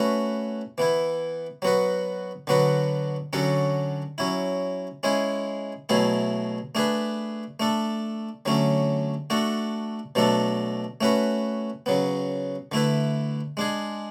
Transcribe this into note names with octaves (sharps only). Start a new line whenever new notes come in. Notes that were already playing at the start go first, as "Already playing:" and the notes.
Already playing: A3 C#4 F#4 B4
E3 B3 E4
F#3 B3 F#4 B4
D3 F#3 B3 F#4 B4
D3 F#3 C#4 F#4 A4
F#3 C#4 E4
G#3 C#4 E4 G#4
B2 F#3 A3 E4 G#4
A3 D4 G#4 B4
A3 D4 A4
D3 F#3 A3 C#4
A3 D4 F#4 A4
B2 F#3 A3 D4 A4
A3 C#4 F#4 B4
C#3 F#3 B3
D3 A3 E4 B4
G#3 D4 G#4